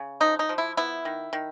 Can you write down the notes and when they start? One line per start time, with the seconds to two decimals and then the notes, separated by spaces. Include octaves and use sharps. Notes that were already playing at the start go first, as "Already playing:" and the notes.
Already playing: C#3
0.20 F3 D#4
0.39 D#4
0.49 F3
0.58 E4
0.77 B3 E4
1.05 D#3
1.33 D#3